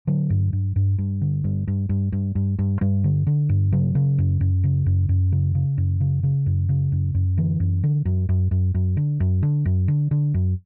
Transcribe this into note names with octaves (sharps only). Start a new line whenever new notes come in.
D3 F#3
G2
G2
G2
G2
D3
G2
G2
G2
G2
G2
G2
G2 G3
D3
D3
G2
C#3 F#3
C#3
F#2
F#2
C#3
F#2
F#2
C#3
C#3
F#2
C#3
C#3
F#2
C#3
F#2
F#2
D3 E3
F#2
D3
F#2
F#2
F#2
F#2
D3
F#2
D3
F#2
D3
D3
F#2